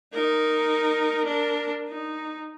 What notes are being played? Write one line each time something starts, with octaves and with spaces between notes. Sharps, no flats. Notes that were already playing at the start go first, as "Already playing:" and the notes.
D#4 A#4
D4 A#4
D#4